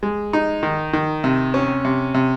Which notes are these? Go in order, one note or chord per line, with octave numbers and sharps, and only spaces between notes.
G#3
D#4
D#3
D#3
C3
C#4
C3
C3